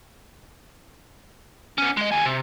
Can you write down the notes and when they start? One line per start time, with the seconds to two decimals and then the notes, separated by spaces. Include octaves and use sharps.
1.78 B3 C#4
1.97 G#3 D#5
2.12 D#2 G#5
2.25 C3